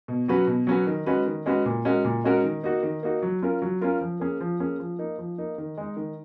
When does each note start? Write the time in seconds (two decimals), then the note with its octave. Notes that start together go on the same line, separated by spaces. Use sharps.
0.08 B2
0.28 F#3 C#4 F#4 B4
0.47 B2
0.67 F#3 C#4 F#4 B4
0.87 D#3
1.06 G#3 C#4 F#4 B4
1.26 D#3
1.46 G#3 C#4 F#4 B4
1.65 A#2
1.85 G#3 C#4 F#4 A#4
2.04 A#2
2.24 G#3 C#4 F#4 A#4
2.44 D#3
2.63 A#3 D#4 F#4
2.83 D#3
3.03 A#3 D#4 F#4
3.22 F#3
3.43 C#4 F4 A#4
3.62 F#3
3.81 C#4 F4 A#4
4.01 F3
4.20 A#3 C#4 G#4
4.40 F3
4.60 A#3 C#4 G#4
4.79 F3
4.99 A#3 D#4
5.18 F3
5.38 A#3 D#4
5.58 D#3
5.77 G#3 D#4
5.97 D#3